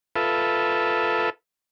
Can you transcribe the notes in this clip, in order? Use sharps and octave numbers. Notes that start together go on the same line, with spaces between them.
F4 A4 B4 E5